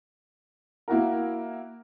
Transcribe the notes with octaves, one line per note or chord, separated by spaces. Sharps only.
A#3 E4 F#4 A#4